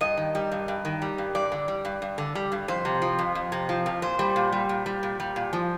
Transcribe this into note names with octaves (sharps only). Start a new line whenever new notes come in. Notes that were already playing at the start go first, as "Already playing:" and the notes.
G2 D#5
D#3
G3
G2
G2
D#3
G3
G2
G2 D5
D3
G3
G2
G2
D3
G3
G2
F2 C5
C3
F3
F2
F2
C3
F3
F2
A#2 C5
G3
A#2
G3
A#2
G3
A#2
G3
A#2
F3